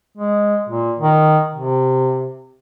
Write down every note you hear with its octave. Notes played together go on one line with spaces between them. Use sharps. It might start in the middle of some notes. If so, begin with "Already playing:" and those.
G#3
A#2
D#3
C3